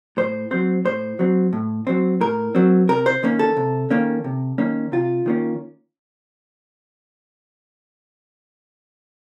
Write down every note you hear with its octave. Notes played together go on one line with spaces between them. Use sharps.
A2 C5
F#3 C4 C5
A2 C5
F#3 C4
A2
F#3 C4
A2 A#4
F#3 C4
C3 A#4
C5
D#3 A#3 C#4
A4
C3
D#3 A#3 C#4
C3
D#3 A#3 C#4
C3 F4
D#3 A#3 C#4